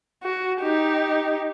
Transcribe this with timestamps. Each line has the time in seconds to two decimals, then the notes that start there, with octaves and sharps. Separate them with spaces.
0.23 F#4
0.61 D#4 G4